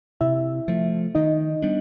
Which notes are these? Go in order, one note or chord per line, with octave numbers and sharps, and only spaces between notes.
C3 E4 E5
F3 A3
D#3 D#4 D#5
G3 B3 D4